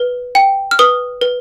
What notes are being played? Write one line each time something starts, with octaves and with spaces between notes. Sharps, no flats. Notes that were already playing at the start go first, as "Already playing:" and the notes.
Already playing: B4
G5
F6
B4 D#6
B4